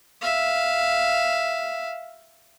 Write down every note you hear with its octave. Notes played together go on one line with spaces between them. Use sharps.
E5 F5